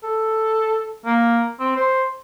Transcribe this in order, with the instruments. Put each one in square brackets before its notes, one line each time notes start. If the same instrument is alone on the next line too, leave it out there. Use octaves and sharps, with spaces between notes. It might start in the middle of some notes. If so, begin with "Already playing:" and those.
[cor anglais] A4
A#3
C4
C5